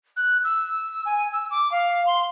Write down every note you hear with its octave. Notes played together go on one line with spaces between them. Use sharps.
F#6
E6
G#5
E6
D6
F5
C6